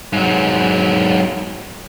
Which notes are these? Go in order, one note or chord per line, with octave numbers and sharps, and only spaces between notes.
G#2 F#3